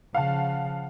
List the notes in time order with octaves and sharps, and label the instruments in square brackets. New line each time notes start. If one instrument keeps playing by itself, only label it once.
[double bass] C#3 F3 [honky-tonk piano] F5 F#5 A5